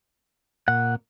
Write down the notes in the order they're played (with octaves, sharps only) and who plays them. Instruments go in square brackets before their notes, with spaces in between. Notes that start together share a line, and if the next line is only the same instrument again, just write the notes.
[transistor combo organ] A#2 [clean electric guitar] F#5